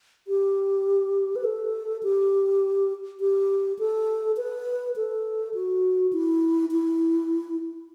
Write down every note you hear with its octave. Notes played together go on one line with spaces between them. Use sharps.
G4
B4
A4
G4
G4
A4
B4
A4
F#4
E4
E4